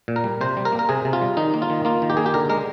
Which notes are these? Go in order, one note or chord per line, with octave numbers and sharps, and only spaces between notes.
A#2
A#4
G3
C3 C5
G3
A#4
A#3
A#4
C3 G#4
C3
F4
G3
D#3 D#4
A#3
F4
D#3
A#3 F4
D#3
G4
A#3 G#4
G4
D3 A#4
G#3 A#4